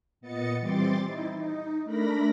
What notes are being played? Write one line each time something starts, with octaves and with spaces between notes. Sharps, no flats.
A#2 B3 D#5 A6 C#7
E3 G3 C4 C6 D6 A6
D#4 E4
D#4
A3 D4 A#4 B5 A#6